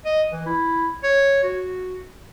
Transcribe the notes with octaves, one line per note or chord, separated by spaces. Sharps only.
D#5
E3
E4
C#5
F#4